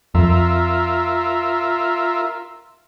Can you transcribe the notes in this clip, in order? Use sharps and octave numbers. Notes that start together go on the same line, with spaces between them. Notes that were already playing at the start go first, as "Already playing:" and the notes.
F2 F4 A#4 E5